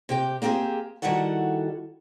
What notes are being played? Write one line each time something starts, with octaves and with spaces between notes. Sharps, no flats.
C3 G4 G5
A#3 C4 F4 G4 G#4
D#3 G3 E4 F#4 A4 F#5